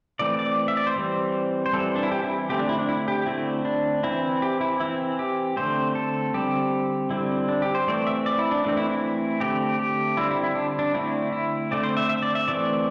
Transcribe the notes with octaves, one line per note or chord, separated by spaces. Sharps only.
E3 A3 C4 D5
D5
E5
D5
C5
E3 G3 C4
C5
E3 G3 C4 A4
D4
E4
G4
E4
D3 A3 C4 G4
D4
E4
D4
E4
G4
D3 A3 C4 E4
D4
E3 C4 E4
G4
E4
E3 C4 E4
G4
D3 A3 C4 C5
A4
D3 G3 C4 G4
D3 G3 C4 E4
D4
G4
C5
E3 A3 C4 D5
E5
D5
E4
D4
E3 A3 C4 D4
E4
E4
D3 A3 C4 G4
G4
D3 G3 C4 E4
E4
E4
D4
D4
D3 A3 C4 E4
E4
D3 A3 C4 D5
C5
E5
E5
D5
E5
E3 A3 C4 D5